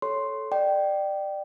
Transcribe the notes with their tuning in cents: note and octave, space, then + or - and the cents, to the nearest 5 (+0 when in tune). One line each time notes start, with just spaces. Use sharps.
A4 -10 C#5 +0 C6 +0
D5 +25 G5 -15